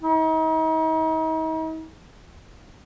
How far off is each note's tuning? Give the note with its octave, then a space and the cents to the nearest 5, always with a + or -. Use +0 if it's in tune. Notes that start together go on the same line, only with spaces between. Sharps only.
D#4 +40